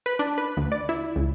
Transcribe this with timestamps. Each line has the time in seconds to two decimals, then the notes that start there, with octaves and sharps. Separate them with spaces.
0.06 B4
0.19 D4
0.38 B4
0.57 D2
0.72 D5
0.89 E4
1.16 C#2